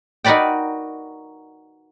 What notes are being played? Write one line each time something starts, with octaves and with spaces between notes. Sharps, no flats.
D#4 F#4 A#4 B4 D5 G5